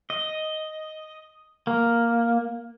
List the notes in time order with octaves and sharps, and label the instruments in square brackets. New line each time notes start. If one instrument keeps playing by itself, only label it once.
[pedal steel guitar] D#5
A#3